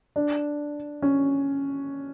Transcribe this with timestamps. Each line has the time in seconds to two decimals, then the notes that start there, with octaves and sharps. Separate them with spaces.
0.16 D4
1.02 C#4